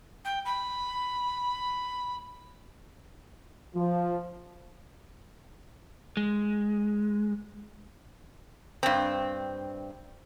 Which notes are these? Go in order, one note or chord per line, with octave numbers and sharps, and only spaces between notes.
G5
B5
F3
G#3
G2 C4